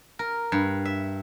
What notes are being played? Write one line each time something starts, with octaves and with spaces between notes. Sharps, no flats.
A#4
G2
E5